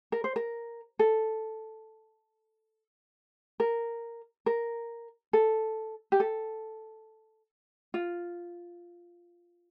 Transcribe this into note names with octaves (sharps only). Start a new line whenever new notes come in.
A#4
C5
A#4
A4
A#4
A#4
A4
G4
A4
F4